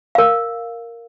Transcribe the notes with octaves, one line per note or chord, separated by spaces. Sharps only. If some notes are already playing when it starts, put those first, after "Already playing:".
A#4 F5